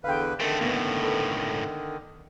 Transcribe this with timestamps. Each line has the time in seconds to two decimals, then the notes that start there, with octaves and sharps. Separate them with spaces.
0.04 E2 D3 B4 F5 G5
0.40 D3 D#3 A3 C4 G#4 A#4 G5
0.60 C#2 A2 A#3 B3
1.03 A4 B4